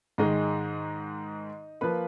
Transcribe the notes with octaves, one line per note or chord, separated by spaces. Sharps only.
G#2 D#3 G#3 D#4 D#5
F3 A#3 B4 B5